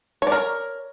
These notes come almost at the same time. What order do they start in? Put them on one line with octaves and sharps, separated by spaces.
C#5 D5 A#4